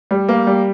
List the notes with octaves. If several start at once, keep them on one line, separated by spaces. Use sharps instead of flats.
G3
A#3
G3